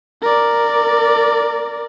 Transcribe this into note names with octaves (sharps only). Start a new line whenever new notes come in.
A#4 D5